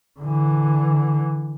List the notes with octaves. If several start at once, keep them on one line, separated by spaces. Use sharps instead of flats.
D3 E3